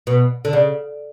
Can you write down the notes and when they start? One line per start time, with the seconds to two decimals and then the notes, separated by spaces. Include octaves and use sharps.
0.07 B2
0.45 D3
0.53 C#3